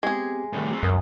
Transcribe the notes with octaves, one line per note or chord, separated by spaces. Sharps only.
G#3 B3 C4 G4 G#4
A2 C3 D#3 G3 A3
F#3 C4
C#2 F#2 A#4 D#6